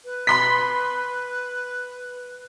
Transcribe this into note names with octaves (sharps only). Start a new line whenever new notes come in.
B4
B5 C6 B6